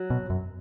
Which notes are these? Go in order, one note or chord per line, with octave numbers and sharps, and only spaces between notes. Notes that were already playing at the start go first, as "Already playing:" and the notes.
Already playing: F#3
B2
F#2